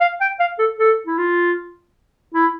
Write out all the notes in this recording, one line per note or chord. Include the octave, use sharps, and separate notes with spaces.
F5
G5
F5
A4
A4
E4
F4
E4